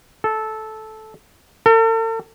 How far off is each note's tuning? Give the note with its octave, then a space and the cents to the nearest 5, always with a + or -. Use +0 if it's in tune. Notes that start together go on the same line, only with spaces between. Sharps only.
A4 -10
A4 +45